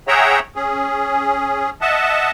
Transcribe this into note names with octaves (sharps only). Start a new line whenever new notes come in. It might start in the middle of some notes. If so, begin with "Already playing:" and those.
G#4 C#5 E5 F#5 G5 A#5
C#4 G#4
D#5 E5 F#5 A5